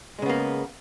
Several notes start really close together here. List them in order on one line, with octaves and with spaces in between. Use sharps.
G#3 C#3 B3 A#3